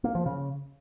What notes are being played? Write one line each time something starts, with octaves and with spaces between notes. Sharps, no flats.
A#3
F3
C#3